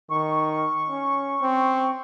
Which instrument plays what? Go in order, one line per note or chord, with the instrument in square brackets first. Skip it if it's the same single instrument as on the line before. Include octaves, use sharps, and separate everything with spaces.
[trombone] D#3 [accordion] C#6
[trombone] C#4
C4